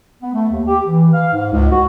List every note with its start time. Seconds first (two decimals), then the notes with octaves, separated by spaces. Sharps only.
0.21 B3
0.33 A3
0.50 D#2
0.66 G4
0.86 E3
1.12 F5
1.32 G#2
1.52 C#2
1.70 F#4